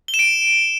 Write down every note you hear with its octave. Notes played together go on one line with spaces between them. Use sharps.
G7
E7
D7